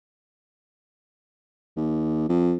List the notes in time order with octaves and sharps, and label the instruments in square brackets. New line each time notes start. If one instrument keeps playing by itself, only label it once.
[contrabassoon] D#2
F2